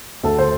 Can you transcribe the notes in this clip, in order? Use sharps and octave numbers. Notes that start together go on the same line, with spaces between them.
D2 A4
C5